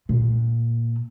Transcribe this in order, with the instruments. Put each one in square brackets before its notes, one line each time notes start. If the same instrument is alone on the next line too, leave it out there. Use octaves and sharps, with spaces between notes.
[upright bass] A#2